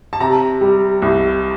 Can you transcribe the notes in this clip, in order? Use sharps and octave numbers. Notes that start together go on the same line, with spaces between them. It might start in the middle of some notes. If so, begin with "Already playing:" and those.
A5
C3 A#5
G3
C2